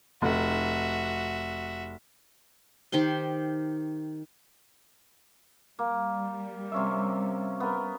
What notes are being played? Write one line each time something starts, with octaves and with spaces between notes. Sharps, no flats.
F1 F#4 E5
D#3 G4 C5 C6
G3 A#3
C3 C#4 E5
B3 A#4